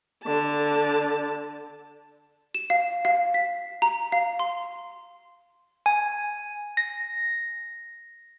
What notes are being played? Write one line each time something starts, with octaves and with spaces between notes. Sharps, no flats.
D3 A5
E7
F5
F5
B6
A#5
F5
C6
G#5
A#6